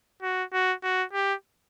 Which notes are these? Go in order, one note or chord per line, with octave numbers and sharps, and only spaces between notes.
F#4
F#4
F#4
G4